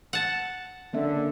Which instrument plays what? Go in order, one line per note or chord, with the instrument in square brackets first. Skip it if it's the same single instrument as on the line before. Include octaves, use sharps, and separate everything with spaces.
[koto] F#5 A5
[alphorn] D3 [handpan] A#3 C#4 E5